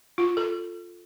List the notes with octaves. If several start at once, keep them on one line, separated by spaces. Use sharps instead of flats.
F4
A4